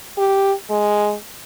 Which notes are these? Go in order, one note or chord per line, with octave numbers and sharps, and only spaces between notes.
G4
G#3